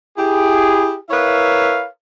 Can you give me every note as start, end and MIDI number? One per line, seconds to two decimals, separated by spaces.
0.17 0.97 64
0.17 0.97 67
0.17 0.97 68
1.09 1.85 64
1.09 1.85 70
1.09 1.85 71
1.09 1.85 73
1.09 1.85 76
1.09 1.85 77